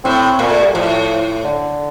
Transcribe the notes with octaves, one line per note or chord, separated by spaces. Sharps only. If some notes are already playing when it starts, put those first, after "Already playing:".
A2 C4
A#2 A#3
A3
G3
A2 F3
D3